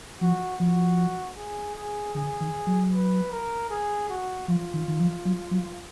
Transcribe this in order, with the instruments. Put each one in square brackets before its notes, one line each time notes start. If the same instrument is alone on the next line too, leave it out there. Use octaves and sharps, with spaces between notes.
[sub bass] F3 [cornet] F#4
[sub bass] F3 [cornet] F#4
[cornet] G#4
G#4
[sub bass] D3 [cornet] G#4
[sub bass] D#3
F#3
[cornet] B4
A#4
G#4
F#4
[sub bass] F3 [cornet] F4
[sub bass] D#3
D#3
F3
F#3
F#3